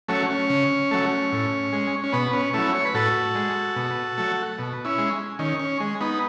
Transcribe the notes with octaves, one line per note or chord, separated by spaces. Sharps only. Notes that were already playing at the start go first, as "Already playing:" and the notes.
F#3 A3 C#4
C#4
C#3
F#3 A3
A2
G#3
C#4
B2 B3
C#4
F#3 A3 C#4 E4
C#5
B4
A2 F#4 A4
G#3
B2
F#3 A3
B2
C#4 E4
G#3
D#3 C#4
C#4
G#3
B3 D#4